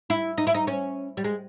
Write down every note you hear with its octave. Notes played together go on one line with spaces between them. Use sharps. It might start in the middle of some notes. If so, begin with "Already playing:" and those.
E4
D#4
E4
D#4
C#4
G3
G#3